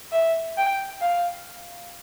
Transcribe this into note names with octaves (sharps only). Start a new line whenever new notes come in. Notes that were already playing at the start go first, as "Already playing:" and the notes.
E5
G5
F5